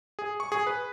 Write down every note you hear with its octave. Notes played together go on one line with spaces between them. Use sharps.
G#4
C#6
G#4
B4